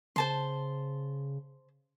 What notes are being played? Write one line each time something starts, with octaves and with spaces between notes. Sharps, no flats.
C#3 C5 A5 C6